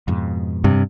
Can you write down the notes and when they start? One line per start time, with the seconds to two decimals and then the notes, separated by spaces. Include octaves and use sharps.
0.08 F2 G#2 B2
0.64 G2 C3